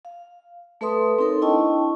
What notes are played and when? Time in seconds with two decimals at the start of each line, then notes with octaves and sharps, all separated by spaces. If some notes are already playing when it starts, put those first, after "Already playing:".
0.05 F5
0.81 A3 A4 B4 E5 C6 D#6
1.19 C4 D#4 A4 A#4 C#5
1.42 D4 E4 D#5 G5 A5 C#6